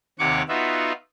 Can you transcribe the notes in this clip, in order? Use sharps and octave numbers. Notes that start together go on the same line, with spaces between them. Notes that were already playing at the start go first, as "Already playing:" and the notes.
D#2 C3 C#5 F#5 C#6 D6
B3 D#4 F4 F#4 E5